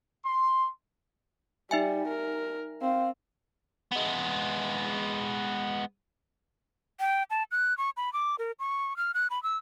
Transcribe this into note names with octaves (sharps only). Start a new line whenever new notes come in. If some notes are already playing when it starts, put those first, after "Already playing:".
C6
G3 D#4 E5 G#5
A#4
C4 F5
G#3 B3
G5
A5
F#6
C#6
B5
D6
A#4
C#6
F6
F#6
B5
E6